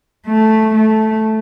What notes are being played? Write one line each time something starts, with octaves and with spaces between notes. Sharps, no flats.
A3
A3